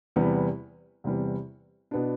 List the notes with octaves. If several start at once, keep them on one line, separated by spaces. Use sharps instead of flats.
E2 C3 G3 B3
E2 C3 G3 B3
B2 B3 D4